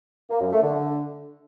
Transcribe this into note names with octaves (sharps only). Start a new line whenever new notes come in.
A#3
F#2
A3
D3